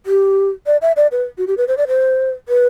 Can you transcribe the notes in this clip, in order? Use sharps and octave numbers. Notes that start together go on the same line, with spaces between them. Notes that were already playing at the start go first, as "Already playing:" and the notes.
G4
D5
E5
D5
B4
F#4
G4
B4
C5
D5
C5
B4